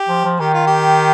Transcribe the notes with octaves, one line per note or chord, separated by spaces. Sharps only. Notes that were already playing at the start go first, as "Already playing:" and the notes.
Already playing: G4
F3
F3
D#3 G4
F4
G4